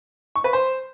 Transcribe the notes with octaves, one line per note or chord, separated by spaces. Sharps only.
C#6
B4
C5